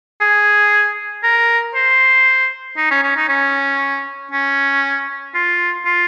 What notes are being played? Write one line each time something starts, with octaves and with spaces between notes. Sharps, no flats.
G#4
A#4
C5
D#4
C#4
C#4
D#4
C#4
C#4
F4
F4